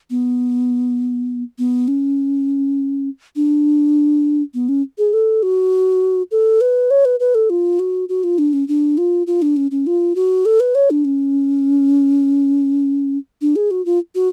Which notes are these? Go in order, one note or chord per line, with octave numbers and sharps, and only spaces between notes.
B3
B3
C#4
D4
B3
C#4
G#4
A4
F#4
A4
B4
C#5
B4
B4
A4
F4
F#4
F#4
F4
D4
C#4
D4
F4
F4
D4
C#4
C#4
F4
F#4
A4
B4
C#5
D4
C#4
D4
G#4
F#4
F4
F#4